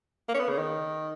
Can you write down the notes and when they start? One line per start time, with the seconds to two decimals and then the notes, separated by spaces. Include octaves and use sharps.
0.28 A#3
0.34 C#4
0.39 B3
0.49 C#3
0.58 D#3